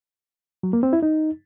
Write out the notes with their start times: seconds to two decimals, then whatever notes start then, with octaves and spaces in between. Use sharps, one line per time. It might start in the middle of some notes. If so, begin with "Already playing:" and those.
0.63 F#3
0.73 A#3
0.83 C4
0.93 E4
1.03 D#4